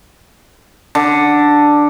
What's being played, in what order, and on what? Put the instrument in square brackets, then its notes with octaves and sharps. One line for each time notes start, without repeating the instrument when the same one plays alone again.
[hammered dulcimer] D3